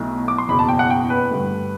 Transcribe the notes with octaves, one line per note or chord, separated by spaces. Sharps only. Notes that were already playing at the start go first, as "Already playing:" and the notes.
Already playing: B1 B2 A3 E4
D6
C6
F#1 E2 B2 B5
A5
G5
F#5
G5
B4
G2 D3 A3